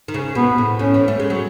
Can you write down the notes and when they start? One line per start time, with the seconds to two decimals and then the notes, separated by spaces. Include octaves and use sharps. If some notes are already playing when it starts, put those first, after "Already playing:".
0.08 D#3
0.14 C#3
0.35 B2 B3
0.58 A2
0.79 A2 C#4
0.94 E3
1.08 A3
1.20 G#3
1.30 F#3